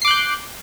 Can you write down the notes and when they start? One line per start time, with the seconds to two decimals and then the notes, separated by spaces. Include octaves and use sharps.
0.02 C7
0.05 D6
0.08 F#6
0.11 G6